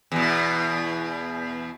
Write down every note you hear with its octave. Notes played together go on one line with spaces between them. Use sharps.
E2 B2